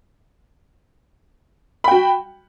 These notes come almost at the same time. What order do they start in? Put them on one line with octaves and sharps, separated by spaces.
B5 G5 F#4